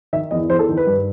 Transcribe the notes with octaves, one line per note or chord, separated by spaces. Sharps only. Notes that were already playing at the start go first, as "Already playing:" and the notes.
D#3 E5
E2 D#5
E2 C5
A4
D#3
B4
G2